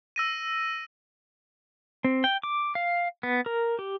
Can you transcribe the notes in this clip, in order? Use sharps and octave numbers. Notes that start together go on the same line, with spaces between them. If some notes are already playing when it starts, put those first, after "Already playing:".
E6 A#6 D#7
C4
G5
D6
F5
B3
A#4
G4